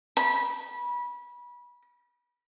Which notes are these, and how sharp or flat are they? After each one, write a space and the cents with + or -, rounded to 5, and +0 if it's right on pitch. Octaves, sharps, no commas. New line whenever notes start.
B5 -25